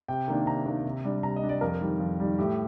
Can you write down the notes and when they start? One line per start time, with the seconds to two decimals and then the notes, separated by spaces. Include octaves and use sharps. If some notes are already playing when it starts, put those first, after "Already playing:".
0.08 C3 G5
0.28 D#3 A#3 D4
0.47 C3 A#5
0.66 D#3 A#3 D4
0.85 C3
1.04 G3 D4
1.23 C3 A#5
1.36 D#5
1.43 G3 D4
1.49 D5
1.61 F2 A#4
1.81 D#3 G3
2.00 F2
2.20 D#3 G3
2.38 A2 G4